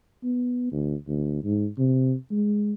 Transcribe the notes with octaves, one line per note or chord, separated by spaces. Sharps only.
B3
D2
D2
G#2
C3
G#3